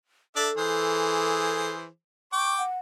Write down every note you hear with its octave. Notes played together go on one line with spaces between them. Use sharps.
D4 A4 D5 E5
E3 G#4 C5
G5 C#6 D6
F#5